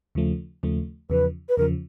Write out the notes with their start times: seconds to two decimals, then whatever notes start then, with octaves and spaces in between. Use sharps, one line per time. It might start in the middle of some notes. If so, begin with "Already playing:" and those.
0.15 D#2 C#3 F3 A3
0.63 D#2 C#3 F3 A3
1.10 E2 C#3 F3 B4
1.49 B4
1.57 E2 C#3 F3 A#4